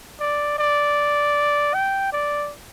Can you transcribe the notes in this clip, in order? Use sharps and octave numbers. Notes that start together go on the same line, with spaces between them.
D5
D5
G5
D5